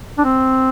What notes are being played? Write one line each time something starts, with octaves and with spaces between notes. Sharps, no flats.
D4
C4